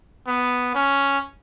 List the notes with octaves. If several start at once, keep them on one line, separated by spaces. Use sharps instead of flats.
B3
C#4